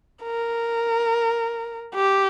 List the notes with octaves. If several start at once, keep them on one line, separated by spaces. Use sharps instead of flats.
A#4
G4